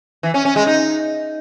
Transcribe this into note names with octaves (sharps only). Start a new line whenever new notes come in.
E3
C#4
C#4
G#3
D#4